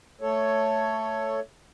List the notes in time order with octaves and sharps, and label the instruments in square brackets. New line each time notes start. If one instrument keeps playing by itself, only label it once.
[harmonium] A3 A4 C#5